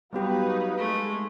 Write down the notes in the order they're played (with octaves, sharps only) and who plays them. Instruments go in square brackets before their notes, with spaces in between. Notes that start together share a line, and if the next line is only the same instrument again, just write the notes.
[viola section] F#3 D#4 B4 [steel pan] G3 B3 G4 [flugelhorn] F5
[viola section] G#3 [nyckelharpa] A3